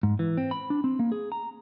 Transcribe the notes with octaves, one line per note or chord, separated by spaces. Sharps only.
G#2
E3
C4
B5
D4
C4
A#3
G#4
A#5